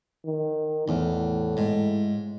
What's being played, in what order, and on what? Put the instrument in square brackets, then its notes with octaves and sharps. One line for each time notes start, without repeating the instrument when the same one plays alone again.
[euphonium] D#3
[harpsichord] E2 [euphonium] A2
[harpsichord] G#2